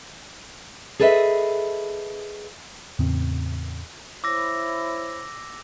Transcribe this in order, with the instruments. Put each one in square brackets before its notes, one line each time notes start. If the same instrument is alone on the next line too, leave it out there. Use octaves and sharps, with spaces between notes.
[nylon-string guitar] G#4 A4 B4 D#5 E5
[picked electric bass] E2 A2 C#3 C4
[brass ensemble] E4 C5 C#5 [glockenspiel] D6 E6 A#6